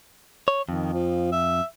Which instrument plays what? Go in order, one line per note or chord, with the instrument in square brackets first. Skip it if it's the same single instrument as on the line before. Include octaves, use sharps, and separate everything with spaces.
[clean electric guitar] C#5
[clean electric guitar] F2 [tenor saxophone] D#3
[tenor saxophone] F3
E5